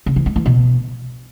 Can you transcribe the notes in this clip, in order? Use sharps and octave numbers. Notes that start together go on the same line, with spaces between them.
C#3
E3
G#3
E3
B2